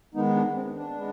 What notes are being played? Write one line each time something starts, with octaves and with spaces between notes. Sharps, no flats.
D#3 G#3 B3 D#4
D4
C4
D4
G#3 B3